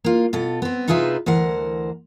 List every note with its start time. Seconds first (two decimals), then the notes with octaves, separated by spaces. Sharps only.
0.04 A#3 F4
0.33 B2 F4 A4
0.62 B3 C4
0.88 C3 D#4 F4 G#4 B4 E5
1.26 D2 E3 A#4 C5 F#5